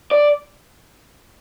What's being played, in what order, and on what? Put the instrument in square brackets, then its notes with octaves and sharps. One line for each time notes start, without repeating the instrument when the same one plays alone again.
[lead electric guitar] D5